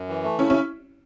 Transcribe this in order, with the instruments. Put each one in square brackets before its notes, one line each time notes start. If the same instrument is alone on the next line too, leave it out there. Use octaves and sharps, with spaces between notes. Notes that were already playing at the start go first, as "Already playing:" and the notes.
Already playing: [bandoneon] F#2
E3
A3
[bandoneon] C#3 [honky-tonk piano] C#4 E4
[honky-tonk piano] C#4 E4